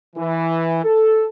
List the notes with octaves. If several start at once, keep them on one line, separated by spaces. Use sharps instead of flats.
E3
A4